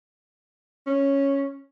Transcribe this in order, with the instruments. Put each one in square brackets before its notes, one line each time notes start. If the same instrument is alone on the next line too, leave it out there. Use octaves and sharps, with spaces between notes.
[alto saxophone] C#4